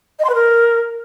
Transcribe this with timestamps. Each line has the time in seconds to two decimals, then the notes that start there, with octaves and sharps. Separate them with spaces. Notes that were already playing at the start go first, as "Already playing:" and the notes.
0.19 D#5
0.24 C6
0.29 B4
0.34 A#4